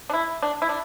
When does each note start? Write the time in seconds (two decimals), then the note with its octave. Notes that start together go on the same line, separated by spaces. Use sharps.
0.09 D4
0.14 E4
0.42 D4
0.62 E4
0.69 D4